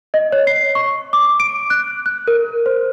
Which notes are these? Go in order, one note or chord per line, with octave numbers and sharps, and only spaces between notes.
D#5
C#5
C7
C#6
D6
D7
F#6
F#6
A#4
C5